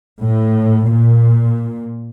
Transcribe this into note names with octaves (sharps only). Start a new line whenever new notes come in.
A2
A#2